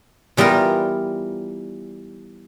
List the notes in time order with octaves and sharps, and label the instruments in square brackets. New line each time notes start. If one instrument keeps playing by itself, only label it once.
[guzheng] E3 G3 B3 F4 A#4